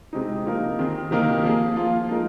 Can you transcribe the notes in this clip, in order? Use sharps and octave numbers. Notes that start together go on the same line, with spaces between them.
C3 G#3 C4 D#4
C3 F3 A#3 D#4 A#4
D#3 C4 G#4
C3 D#3 A#3 D#4 A#4
F3 A#3 G#4
F3 A#3 F4
F3 G#3 D#4 A#4